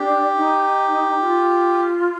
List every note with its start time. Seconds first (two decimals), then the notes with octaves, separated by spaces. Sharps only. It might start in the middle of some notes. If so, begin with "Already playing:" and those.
Already playing: D4 G4
0.36 D#4
1.20 F4